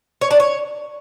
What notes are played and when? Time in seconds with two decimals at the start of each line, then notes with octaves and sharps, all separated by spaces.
0.21 C#5
0.31 D4
0.40 C#5